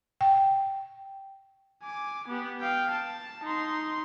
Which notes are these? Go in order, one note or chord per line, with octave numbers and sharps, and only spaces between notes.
G5
G#5 D6
B3 G4
F5 G5
A5
D#4 C6